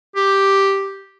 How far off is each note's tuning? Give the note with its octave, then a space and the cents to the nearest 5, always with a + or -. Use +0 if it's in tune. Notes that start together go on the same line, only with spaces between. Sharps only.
G4 +0